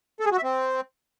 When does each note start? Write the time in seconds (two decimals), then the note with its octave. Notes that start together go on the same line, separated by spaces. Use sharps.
0.20 A4
0.26 G#4
0.32 F#4
0.38 E5
0.43 C4